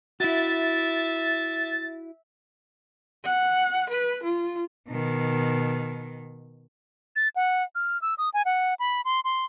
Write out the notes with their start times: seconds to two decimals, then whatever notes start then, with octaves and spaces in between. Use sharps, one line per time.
0.20 E4 F#4 E5 A6
3.24 F#5
3.90 B4
4.23 F4
4.89 B2 D#3
7.16 A6
7.36 F#5
7.75 F6
8.02 E6
8.18 D#6
8.34 G#5
8.45 F#5
8.79 B5
9.05 C6
9.24 C6